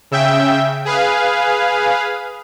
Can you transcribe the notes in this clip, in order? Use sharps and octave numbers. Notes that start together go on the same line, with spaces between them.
C#3 E5 G5
G#4 B4 F5